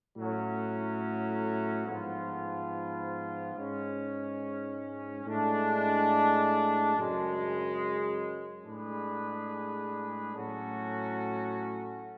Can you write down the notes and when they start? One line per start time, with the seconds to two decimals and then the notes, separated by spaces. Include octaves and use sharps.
0.16 A2 F#3 C#4
1.87 G#2 F3 B3 F4
3.56 G#2 G#3 C#4
5.26 A2 G#3 D4
6.96 F#2 C#3 G#3
8.64 A2 G#3 D4 G#4 B4
10.35 A2 F#3 C#4 F#4 A4